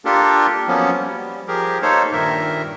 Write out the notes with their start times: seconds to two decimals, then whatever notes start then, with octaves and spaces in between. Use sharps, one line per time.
0.05 A#3 D4 F4 G4 A4 A#4
0.68 F3 F#3 A#3 B3 C#4
1.01 G3
1.48 F3 G4 G#4 A#4
1.82 A#3 D#4 A4 C5 C#5
2.13 G2 A#2 D#3 A#4 E5